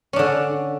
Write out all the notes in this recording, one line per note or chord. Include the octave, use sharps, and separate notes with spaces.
D3 C#4 D4